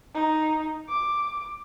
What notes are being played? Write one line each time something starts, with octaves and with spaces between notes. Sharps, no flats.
D#4
D6